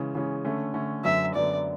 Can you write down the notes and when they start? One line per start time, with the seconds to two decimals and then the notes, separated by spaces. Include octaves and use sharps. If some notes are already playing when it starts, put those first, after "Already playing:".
Already playing: C#3 E3 G#3 C#4
0.15 C#3 E3 G#3 C#4
0.44 D3 A3 C#4
0.74 D3 A3 C#4
1.04 F#2 D3 F#3 B3 E5
1.34 F#2 D3 F#3 B3 D5